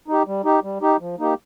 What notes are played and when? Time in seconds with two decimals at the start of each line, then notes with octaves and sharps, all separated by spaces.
0.08 D#4 G4
0.27 G3
0.45 D#4 G4
0.64 G3
0.82 D#4 G4
1.01 F3
1.19 A#3 D#4 G4